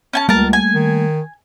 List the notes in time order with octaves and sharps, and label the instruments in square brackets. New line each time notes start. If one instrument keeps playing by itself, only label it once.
[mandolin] C#4 G#5 A5
[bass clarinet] C#2 [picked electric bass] G3 A3 A#3 [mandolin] A#4 A5
[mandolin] G#5
[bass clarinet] D#3